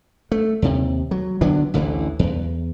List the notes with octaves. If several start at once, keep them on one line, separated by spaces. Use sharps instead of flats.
A3
D#2 C3
F#3
D3 F#3 B3 D4
A1 D2 D3 E3
E2